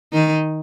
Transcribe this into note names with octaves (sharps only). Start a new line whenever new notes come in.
D#3 D#4